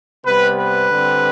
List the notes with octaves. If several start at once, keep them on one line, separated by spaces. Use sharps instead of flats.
C3 G3 B3 B4
B4
D3 G3 C4